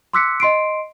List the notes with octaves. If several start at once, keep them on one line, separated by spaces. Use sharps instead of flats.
C6 D6 E6 F#6 B6 C#7
D#5 C6 C7 D7